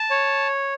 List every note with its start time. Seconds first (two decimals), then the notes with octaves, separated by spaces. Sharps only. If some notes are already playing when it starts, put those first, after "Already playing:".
Already playing: A5
0.10 C#5